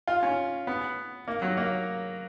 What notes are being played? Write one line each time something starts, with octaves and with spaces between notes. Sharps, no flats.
F4
C#4
B3
A#3
F#3
A#3